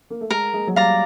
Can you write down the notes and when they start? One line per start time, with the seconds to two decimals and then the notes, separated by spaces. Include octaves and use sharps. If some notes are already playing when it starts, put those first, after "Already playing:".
0.10 A#3
0.21 A3
0.30 G#3 A#4
0.54 G#3
0.67 F#3
0.76 G3 D5 F5 A#5